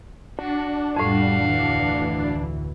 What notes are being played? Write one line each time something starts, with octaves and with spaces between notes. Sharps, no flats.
D4 F#4
F2 A2 G3 F#4 F5
D2 E3